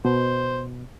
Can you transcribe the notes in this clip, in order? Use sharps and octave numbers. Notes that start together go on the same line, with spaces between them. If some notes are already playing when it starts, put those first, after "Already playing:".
B2 C5